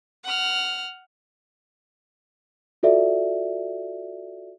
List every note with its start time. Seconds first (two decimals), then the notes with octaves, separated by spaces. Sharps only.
0.24 F#5 F6
2.83 F4 F#4 A4 D5 E5